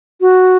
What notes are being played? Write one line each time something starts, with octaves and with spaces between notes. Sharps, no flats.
F#4